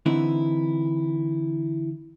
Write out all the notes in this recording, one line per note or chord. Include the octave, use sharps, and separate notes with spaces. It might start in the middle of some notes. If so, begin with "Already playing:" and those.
D3 E3 C4 D#4 E4